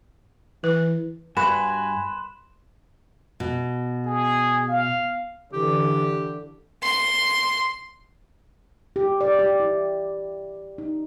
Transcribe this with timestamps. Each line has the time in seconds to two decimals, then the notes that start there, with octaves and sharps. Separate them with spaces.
0.64 E3 B4
1.37 G2 F#4 B4 G#5 C6 F#6 E7
3.40 B2
4.05 G#4
4.68 F5
5.53 D3 E3 G4
6.83 C6
8.96 G4
9.21 D5
9.39 G4
9.60 E4
10.78 D#4